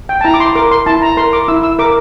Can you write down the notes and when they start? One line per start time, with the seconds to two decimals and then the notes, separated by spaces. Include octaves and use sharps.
0.09 G5
0.21 A5
0.24 E4 A#5
0.34 D6
0.40 C6
0.56 A#4 D6
0.71 C6
0.86 E4 A5
1.02 A#5
1.17 A#4 C6
1.33 D6
1.48 E4 E6
1.63 E6
1.79 A#4 D6